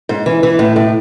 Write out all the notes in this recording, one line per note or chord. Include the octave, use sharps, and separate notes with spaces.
G#2
E3
E3
A2
A2